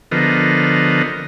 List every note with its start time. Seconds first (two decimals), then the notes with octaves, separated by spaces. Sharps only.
0.11 D3 F3 B3 A#4 D#5